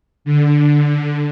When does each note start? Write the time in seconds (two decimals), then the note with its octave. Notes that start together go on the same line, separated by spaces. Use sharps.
0.25 D3